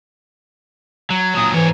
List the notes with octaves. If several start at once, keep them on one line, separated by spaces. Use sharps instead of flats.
F#3
A#2 F#3 D#6
G#2 E3 C#5